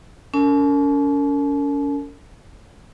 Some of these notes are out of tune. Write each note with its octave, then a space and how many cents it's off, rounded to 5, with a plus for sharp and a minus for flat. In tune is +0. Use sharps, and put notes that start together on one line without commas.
C#4 +35 A#4 -35 A5 -45